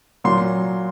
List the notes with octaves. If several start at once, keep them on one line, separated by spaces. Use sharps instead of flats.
A#2 F#3 C6